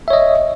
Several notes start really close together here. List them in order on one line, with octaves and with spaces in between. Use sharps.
E5 C#5 D#5